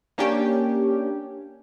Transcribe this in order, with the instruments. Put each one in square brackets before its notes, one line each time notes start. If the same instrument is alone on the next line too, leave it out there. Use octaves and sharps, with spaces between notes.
[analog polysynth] A#3 C#4 D4 G4